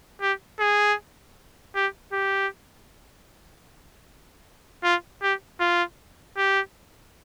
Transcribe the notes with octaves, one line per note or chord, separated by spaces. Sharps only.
G4
G#4
G4
G4
F4
G4
F4
G4